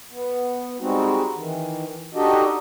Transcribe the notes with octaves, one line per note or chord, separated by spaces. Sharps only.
B3
G3 G#3 C4 D#4 F#4
D#3 E3
D4 D#4 F#4 G4 A4 D#5